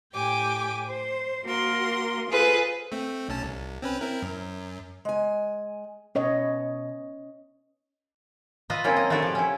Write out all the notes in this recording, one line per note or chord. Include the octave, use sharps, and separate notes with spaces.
A2 G4 G5 G#5 D6
C5
A#3 F#4 A#4 C6
F4 G#4 A4 B4 C5
A3 C4
B1 C#4 A5
C2
C4 C#4 B4
C4 E4 A#4
F#2
G#3 G#5
B2 C#4 C#5 D#5
F4 B4 D#5 E5
F#3 A#3 C4 C#4 E4 F4
D#5
A3 D4 E4 F#4 G4 A4
F3 G4
C#4 E4